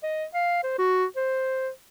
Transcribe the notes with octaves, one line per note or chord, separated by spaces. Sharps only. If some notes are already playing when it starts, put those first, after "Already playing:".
D#5
F5
C5
F#4
C5